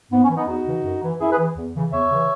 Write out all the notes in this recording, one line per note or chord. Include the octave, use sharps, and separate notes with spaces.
G#2 B3
C#4
E3
B3 D#4
E2 D#4 F#4
C#3 E3
F#2
E3
F#2 E4 G#4
G#4 B4
E3
E2
C#3 E3
E2 C#5 E5
C#3 E3